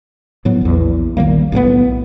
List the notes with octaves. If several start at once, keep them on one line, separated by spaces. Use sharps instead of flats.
A2 F#3 B3
A#1 E2
A#1 D#3 G3 A#3
B1 A2 F#3 B3